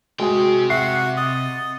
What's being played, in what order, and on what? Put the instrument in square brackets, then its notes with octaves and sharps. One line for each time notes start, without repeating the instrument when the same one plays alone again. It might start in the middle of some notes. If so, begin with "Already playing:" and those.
[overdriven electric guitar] C3 G5 [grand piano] G#3 G#4 [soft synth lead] F#4
[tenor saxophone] F#4 [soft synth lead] E5 [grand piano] C7
[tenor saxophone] D#5 [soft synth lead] A6